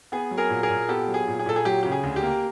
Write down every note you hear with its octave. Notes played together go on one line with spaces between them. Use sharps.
B3 G#4
F#3
G#4 A#4
A#2
G#4 A#4
A#2
B3 G4 A4
F#3
G#4
A#2
G#4
A#2 A4
G#4
F#3 G4
C#3 G4
G#4
D2
G4
A#3